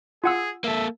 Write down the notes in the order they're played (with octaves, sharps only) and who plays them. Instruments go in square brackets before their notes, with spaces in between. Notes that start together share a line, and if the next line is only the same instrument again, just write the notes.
[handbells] F4 F#5 E6 [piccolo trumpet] G#4
[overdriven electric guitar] A#3 A4 [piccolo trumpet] E5